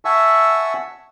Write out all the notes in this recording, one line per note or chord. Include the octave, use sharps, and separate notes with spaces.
E5 F#5 G#5 A5 C#6 E6